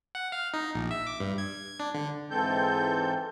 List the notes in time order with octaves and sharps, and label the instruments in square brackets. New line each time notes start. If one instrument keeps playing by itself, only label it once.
[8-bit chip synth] F#5
F5
D#4
A#1
E5
D6
G2
G#6
D4
D3
[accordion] G#2 E3 G#3 C4 A4 G6